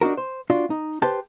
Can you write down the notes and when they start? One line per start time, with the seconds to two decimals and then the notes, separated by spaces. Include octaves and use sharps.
0.01 D4 D#4 F#4 A#4
0.17 C5
0.50 D4 F4 F#4 D5
0.70 D#4
1.02 G4 B4 C5 A5